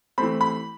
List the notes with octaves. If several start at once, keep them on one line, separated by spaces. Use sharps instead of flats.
E3 A3 C4 B5
B5